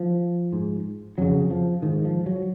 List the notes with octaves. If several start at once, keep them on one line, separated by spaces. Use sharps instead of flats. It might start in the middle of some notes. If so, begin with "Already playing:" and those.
Already playing: F3
G#2
F2 C#3 F#3
F3
G#2 D#3
F3
F#3